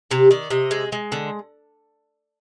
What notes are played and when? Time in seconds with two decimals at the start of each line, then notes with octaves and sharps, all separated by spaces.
0.11 C3 G4
0.31 D#3 D5
0.50 C3 D#5
0.71 G#3
0.92 G#3
1.12 D3